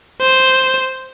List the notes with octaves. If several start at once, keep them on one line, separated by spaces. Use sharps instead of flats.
C5